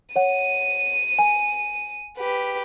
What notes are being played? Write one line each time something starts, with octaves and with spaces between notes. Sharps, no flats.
C#5 F#5 D#7
G#5
G4 B4